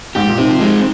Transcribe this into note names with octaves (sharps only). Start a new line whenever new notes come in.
G#2 G4
A#2
D#3 C4
F3
G#3 D#4